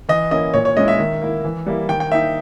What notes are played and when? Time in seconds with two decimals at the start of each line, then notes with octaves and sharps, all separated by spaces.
0.09 E3 D#5
0.31 A#3 C#4 E4 D#5
0.54 A#2 C#5
0.65 C#5
0.77 G#3 C#4 E4 D#5
0.88 E5
0.99 D#3
1.22 A#3 E4
1.44 E3
1.66 G3 A#3 E4
1.89 D#3 G5
2.00 G5
2.11 A#3 D#4 E5